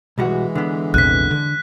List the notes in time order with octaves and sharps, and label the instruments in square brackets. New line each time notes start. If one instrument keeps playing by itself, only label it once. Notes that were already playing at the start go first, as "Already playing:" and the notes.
[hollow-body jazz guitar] B1 G3 F#4 [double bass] E3 G#3
[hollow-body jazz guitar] D3 B3
[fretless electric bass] A#1 E2 C3 [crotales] F#6 B6
[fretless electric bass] D3